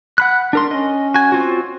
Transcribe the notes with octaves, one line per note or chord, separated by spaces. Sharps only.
F#5 B5 F#6
D4 A#4 C6
C#4 D#5
F#4 G#5
C4 F4 F#4